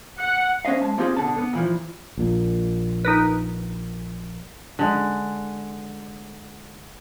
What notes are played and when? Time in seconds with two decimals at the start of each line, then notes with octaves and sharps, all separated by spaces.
0.19 F#5
0.65 A#3 C#4 C5 D#5 F5
0.81 G#3 A5
0.98 A#3 C4 C#4 F4 G4 G#4
1.17 B2 D3 A5
1.38 B3
1.53 A#2 E3 F3
2.18 A#1 A#2
3.05 D#4 A#4 B4
4.79 D3 G#3